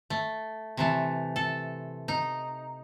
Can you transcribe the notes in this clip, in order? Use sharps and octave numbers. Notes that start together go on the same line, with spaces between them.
A3
C3 E3 A3
A4
D#4